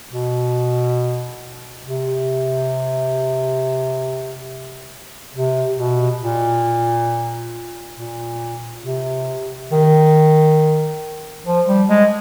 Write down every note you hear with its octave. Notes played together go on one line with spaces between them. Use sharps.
B2
C3
C3
B2
A#2
A#2
C3
D#3
F3
G3
G#3